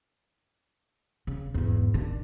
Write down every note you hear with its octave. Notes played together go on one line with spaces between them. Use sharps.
C#3
E2 G#2
D#3 D4